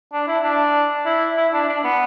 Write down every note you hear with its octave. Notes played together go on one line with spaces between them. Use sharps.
D4
E4
D4
E4
E4
D4
D4
B3